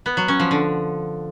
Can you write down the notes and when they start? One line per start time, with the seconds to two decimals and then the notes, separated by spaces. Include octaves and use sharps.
0.06 B3
0.17 F#3
0.28 C#4
0.40 F3
0.51 D3